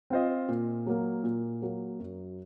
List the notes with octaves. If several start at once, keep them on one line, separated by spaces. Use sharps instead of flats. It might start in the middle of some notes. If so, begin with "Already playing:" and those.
C4 F4 C5 D#5
A#2
F#3 A#3
A#2
F#3 A#3
F#2